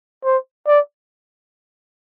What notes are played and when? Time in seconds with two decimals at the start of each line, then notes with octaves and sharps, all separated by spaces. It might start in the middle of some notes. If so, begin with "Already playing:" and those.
0.24 C5
0.67 D5